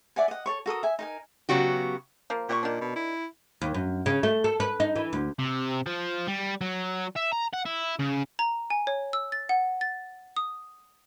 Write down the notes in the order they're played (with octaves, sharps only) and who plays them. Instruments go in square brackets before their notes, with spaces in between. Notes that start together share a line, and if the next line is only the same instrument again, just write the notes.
[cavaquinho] D5 E5 F#5 G#5
D#5 F#5
A4 C#5 C#6
F#4 A4 A#4 D#6
E5 G#5
D#4 A#4 G#5
[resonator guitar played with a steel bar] C#3 F#3 B3 F#4 G4
[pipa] F3 A#3
[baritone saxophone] A#2 [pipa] G4 D#5 C#6
[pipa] D#3 D4
[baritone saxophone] B2
E4
[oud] D#2
F#2
C#3
A3
A4
B4
D#4
E3
D2
[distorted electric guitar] C3
F3
G3
F#3
E5
A#5
F#5
E4
C#3
[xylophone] A#5
G#5
C#5
E6
A6
F#5
A6
D#6